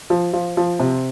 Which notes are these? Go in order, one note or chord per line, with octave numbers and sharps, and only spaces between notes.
F3
F3
F3
C3